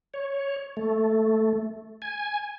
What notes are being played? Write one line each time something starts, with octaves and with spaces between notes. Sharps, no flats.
C#5
A3
G#5